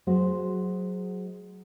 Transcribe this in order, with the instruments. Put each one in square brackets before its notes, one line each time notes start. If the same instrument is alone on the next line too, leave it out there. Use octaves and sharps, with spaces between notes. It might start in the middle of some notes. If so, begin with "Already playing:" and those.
[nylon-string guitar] F#3 G#3 F#4 C5